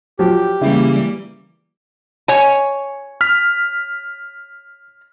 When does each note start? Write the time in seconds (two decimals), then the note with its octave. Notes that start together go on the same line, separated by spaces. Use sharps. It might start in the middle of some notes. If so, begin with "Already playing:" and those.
0.19 F3 F#3 G4
0.61 C#3 E3 G3 A#3 E4
2.28 C#5 G#5
3.21 F6 B6